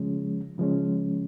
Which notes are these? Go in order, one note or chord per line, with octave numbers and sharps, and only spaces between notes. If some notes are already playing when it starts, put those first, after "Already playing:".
Already playing: C#3 F3 G#3 C#4
C#3 F3 G#3 C#4